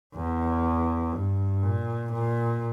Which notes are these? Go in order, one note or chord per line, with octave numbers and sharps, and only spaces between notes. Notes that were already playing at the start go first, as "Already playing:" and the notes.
E2
G2
A#2
A#2